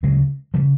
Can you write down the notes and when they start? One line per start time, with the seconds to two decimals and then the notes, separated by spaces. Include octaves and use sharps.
0.03 D2 C#3 F#3 G#3
0.54 C#3 F3 G3